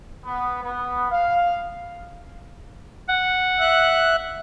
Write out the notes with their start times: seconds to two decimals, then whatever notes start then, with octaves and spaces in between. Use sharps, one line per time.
0.25 B3
0.63 B3
1.11 F5
3.09 F#5
3.59 E5 F#6